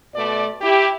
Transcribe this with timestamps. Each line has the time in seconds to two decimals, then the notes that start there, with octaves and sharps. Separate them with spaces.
0.15 B2 A3 D5
0.61 E4 G4